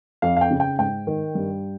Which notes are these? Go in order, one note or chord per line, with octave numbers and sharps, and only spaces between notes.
F2 F5
F5
G5
C#3
G5
G#2 G5
D#3
G2